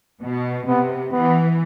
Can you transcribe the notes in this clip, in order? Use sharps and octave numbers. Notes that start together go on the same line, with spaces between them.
B2
C3 B3
E3 B3